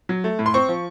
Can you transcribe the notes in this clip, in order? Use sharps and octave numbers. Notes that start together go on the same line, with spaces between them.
F#3
A3
A2
C6
C4 C#6
F3